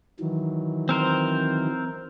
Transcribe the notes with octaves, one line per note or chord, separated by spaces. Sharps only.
D#3 E3 F#3
C4 A#4 C5